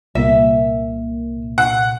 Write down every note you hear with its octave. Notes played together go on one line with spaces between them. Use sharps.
C2 A#2 A#3 E5
F#5